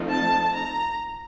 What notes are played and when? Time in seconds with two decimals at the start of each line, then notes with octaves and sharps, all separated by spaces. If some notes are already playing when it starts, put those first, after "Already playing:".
Already playing: F3 A3 C4 D#4
0.08 A5
0.54 A#5